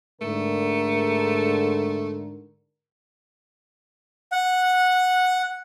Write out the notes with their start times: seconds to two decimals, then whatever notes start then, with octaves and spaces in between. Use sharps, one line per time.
0.22 G#2 D3 A3 A#4
4.32 F#5